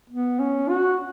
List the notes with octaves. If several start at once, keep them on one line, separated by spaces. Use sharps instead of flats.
B3
C#4
F#4